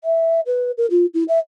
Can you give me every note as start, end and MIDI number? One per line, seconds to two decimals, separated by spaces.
0.04 0.40 76
0.46 0.71 71
0.77 0.86 70
0.90 1.06 65
1.14 1.23 64
1.28 1.39 76